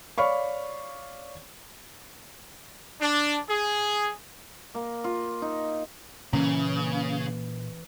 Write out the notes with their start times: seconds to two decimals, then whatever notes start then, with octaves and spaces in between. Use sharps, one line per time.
0.18 C#5 D5 F5 B5 C#6
3.01 D4
3.49 G#4
4.75 A#3
5.04 F4
5.42 D#4
6.33 A#2 C#3 E3 A#3 C#4